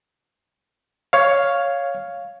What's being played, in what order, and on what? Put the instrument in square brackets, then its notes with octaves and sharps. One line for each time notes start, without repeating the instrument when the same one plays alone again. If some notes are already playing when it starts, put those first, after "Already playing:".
[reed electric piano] C#5 F5